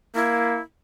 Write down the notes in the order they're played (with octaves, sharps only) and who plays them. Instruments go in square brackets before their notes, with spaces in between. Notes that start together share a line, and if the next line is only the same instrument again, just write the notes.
[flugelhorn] A#3 [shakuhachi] E4